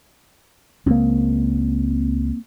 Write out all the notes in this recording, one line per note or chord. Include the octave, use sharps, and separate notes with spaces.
C#2 A#3 C4